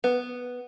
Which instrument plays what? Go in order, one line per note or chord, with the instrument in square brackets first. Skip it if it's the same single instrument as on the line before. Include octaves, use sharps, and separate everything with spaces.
[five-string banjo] B3